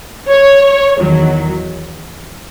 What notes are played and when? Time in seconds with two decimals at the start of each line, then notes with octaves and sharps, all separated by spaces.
0.28 C#5
0.98 E2 D#3 F#3